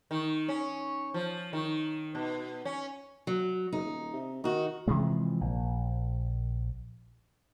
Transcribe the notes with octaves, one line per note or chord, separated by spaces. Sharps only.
D#3
C#4
F3
D#3
B2
C#4
F#3
F#1 D#4
D#1
C3
D#3 D#4 F#4
C3 E3 F3 G#3
A#1